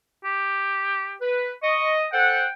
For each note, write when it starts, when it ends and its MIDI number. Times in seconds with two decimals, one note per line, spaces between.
0.25 1.16 67
1.21 1.50 71
1.63 2.05 75
1.63 1.94 85
2.12 2.43 69
2.12 2.43 72
2.12 2.43 78
2.12 2.53 79